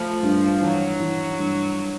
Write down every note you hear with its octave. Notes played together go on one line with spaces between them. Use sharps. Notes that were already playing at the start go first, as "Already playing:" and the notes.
Already playing: F3 A3
G2
E3 F#3
E3
G2